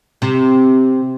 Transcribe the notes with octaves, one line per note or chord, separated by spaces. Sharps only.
C3